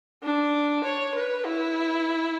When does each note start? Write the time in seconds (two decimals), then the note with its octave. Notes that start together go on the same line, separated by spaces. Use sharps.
0.22 D4
0.83 C#5
1.15 B4
1.45 E4